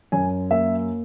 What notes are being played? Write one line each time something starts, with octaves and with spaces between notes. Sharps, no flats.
F#2 G#5
A#3 E5